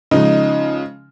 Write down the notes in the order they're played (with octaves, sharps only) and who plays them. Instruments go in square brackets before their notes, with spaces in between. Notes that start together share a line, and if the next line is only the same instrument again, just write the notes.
[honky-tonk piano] C#3 F3 G#3 [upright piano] D#4